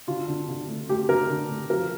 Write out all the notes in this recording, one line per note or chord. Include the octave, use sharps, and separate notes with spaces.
D3 F4
D3
D3
A3
A3 G4
D3 A#4
D3
A3
F3 A#4